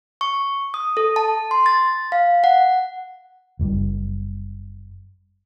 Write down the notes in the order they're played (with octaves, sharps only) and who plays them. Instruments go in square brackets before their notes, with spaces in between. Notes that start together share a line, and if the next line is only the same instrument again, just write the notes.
[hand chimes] C#6
D#6
A4
A5
C6
A6
F5
F#5
[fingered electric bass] F#1 F#2 G3